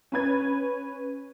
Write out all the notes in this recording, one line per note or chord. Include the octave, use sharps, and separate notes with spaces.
C#4 B4 G#6